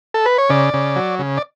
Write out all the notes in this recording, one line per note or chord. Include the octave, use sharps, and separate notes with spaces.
A4
B4
C#5
C#3 D5
C#3
F#3
C#3
D5